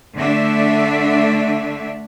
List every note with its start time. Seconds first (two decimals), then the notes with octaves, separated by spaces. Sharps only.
0.16 D3 A3 D4 E5